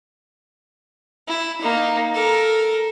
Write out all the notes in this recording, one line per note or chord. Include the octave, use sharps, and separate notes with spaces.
E4
A#3 D#4
A4 A#4